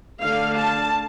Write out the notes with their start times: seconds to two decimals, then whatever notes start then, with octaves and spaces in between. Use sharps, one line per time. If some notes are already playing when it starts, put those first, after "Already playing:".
0.23 D3 A3 D4 F5
0.57 A5